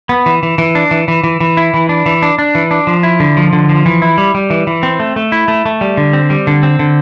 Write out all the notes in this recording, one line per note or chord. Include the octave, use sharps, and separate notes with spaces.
B3
E3
E3
E3
D4
E3
E3
E3
E3
E4
E3
D4
E3
D4
D4
E3
D4
F3
E4
D3
F3
D3
F3
E3
E4
G3
G3
E3
E3
C4
A3
A3
E4
A3
A3
G3
D3
C4
G3
D3
C4
D3